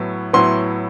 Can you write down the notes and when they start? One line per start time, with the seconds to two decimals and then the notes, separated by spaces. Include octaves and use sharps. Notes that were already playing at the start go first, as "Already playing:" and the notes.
Already playing: A2 F#3 B3 E4
0.33 A2 F#3 B3 E4 C6